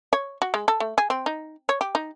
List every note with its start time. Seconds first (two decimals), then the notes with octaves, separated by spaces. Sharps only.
0.13 C#5
0.42 F#4
0.54 G#3
0.68 A4
0.80 A3
0.98 G#4
1.10 C4
1.26 D#4
1.69 C#5
1.81 G4
1.95 D#4